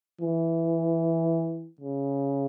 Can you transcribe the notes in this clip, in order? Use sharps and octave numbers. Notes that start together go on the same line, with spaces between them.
E3
C#3